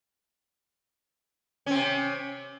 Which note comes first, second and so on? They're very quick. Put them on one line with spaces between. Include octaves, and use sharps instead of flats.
C#4 C4 C3